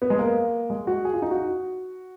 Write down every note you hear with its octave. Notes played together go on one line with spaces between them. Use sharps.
B3
G#3
A#3
G#3
F#4
G#4
F4
D#4
F#4